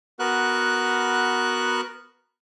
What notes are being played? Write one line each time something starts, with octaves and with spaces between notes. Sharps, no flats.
B3 F#4 A#4 B4 F#6